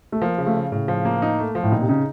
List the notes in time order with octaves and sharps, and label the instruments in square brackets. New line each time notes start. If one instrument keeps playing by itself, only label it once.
[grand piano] A3
[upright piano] F3 [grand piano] A#3
[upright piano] C#3
[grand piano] A3
[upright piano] C#3
[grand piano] A2 [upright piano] C#3
[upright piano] F3
A#3
D#4
A3
F3
[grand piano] A2
[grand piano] A#2 [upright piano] D#4
[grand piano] C3
[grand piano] C#3 [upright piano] D#4